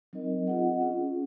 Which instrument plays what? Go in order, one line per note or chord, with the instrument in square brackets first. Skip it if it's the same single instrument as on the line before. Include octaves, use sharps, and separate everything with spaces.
[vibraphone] F#3 C4 D#4 A#4 D#5
C4 F4 G#4 D#5 F#5
C#4 F4 G#4